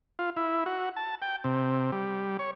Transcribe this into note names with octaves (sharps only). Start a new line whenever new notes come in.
F4
E4
F#4
A5
G5
C3
G3
C#5